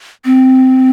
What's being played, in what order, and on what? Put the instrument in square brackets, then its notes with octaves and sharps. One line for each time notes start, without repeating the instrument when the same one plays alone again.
[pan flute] C4